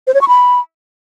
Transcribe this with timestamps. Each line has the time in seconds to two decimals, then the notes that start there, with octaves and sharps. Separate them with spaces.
0.07 C5
0.14 C#5
0.21 C#6
0.28 B5